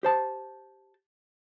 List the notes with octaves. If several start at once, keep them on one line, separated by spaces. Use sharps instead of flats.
G4 C5 A5